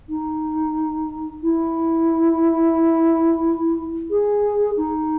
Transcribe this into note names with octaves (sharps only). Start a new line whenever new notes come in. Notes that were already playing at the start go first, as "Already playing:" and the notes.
D#4
E4
G#4
D#4